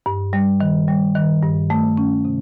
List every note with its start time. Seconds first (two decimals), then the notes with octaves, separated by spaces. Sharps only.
0.06 G2
0.33 G3
0.61 D#3
0.88 G3
1.15 D#3
1.43 G2
1.70 A3
1.98 C#4
2.25 C3